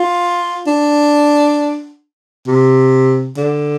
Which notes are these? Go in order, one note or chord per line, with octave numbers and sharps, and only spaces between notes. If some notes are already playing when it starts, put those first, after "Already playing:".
Already playing: F4
D4
C3
D3